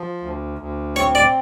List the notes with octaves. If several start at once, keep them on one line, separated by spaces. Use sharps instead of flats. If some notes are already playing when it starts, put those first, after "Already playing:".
Already playing: F3
D2
D2
C4 C#5
D5